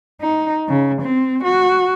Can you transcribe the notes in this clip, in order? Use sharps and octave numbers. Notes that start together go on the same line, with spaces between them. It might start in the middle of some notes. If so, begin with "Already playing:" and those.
D#4
C#3
C4
F#4